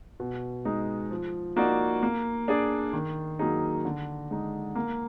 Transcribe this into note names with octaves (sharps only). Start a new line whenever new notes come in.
B2
G#3 D#4
F3
A#3 D#4 F#4 D5
A#3
D4 G#4 D5
D#3
F#3 A#3 D#4 G#4
D3
G#3 D#4
A#3